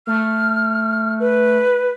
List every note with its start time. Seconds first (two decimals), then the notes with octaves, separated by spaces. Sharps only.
0.07 A3 F6
1.20 B4